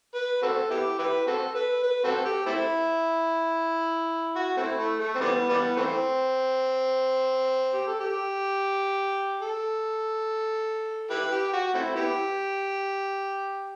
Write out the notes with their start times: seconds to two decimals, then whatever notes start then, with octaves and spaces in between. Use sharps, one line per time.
0.14 B4
0.42 C4 F#4 A4
0.70 B3 E4 G4
0.98 E4 G4 B4
1.27 C4 F#4 A4
1.55 B4
1.83 B4
2.04 C4 F#4 A4
2.25 G4
2.46 A3 C4 E4
4.36 F#4
4.57 A3 C4 E4
4.78 A3
4.99 A3
5.15 C4
5.21 E3 G3 B3
5.49 E3 G3 B3
5.77 E3 A3 C4
7.73 G4
7.87 A4
8.01 G4
9.42 A4
11.10 E4 G4 B4
11.32 G4
11.53 F#4
11.74 A3 C4 E4
11.95 B3 E4 G4